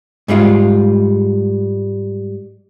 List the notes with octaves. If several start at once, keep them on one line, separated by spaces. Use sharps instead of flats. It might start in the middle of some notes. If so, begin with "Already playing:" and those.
G#2 G3 G#3 F4